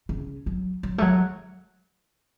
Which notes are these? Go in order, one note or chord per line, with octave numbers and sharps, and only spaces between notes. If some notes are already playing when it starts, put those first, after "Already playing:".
C#3
F#3
F#3
A3
F#3